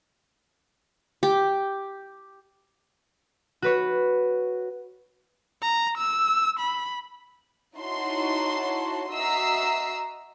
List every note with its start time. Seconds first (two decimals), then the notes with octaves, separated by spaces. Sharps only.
1.23 G4
3.62 F#4 B4 C#5
5.62 A#5
5.98 E6
6.59 B5
7.76 D#4 E4 F#4 C#5 A5 C6
9.10 F#4 D#5 E5 A#5 E6 C7